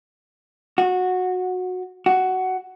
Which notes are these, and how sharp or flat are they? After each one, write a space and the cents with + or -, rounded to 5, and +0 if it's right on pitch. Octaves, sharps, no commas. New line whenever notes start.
F#4 -15
F#4 +10